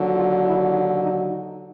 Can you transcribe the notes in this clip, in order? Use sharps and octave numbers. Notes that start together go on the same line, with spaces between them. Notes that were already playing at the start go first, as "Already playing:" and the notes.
Already playing: D#2 D3 F#3
F4
E4
D#4
D#4
D#4